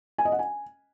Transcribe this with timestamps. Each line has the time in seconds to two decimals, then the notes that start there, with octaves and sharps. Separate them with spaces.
0.18 G#5
0.25 D#5
0.32 F#5
0.39 G#5